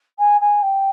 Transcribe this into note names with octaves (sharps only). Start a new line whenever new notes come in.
G#5
G#5
G5